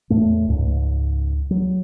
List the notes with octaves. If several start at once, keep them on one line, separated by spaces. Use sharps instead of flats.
E2 A2 A3
C#2 G#2
F#3